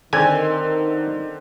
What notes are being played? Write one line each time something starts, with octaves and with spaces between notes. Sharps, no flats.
D3 D#3 C4 G#5